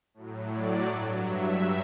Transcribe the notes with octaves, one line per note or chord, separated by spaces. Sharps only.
A2 F#3
D5
G2 F#3
E5